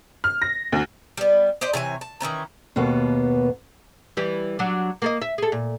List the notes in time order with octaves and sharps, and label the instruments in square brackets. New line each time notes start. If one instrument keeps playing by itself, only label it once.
[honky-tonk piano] F6
A#6
D2
[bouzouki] G3 B3
G4 C5 D5 D#5
C3 E3 C#5 G#5
A5
D#3 E3 C#4 A#5
[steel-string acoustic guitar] D#2 B2 A#3 B3
[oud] E3 G3
F#3 D4
A#3 A4 D#5
E5
G#4 A4
A#2